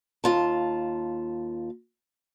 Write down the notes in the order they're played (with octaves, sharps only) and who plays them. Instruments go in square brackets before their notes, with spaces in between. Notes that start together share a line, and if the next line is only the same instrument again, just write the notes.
[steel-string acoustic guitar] D#2 F4 A5